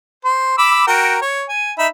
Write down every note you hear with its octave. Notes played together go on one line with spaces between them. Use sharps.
C5
B5 D6 E6
F#4 A#4 G5
C#5
G#5
D#4 E5 B5